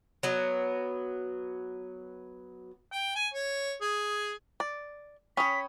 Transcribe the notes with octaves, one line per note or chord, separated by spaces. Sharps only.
F#3 B3
G5
G#5
C#5
G#4
D5
C#4 C#5 G5 B5 D#6 B6